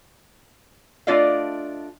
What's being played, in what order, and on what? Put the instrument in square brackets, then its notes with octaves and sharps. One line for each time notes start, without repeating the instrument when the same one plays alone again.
[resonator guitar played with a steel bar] A3 D4 F4 D5 D#5 F5